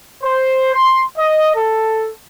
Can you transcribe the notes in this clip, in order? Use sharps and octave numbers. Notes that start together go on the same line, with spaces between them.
C5
C6
D#5
A4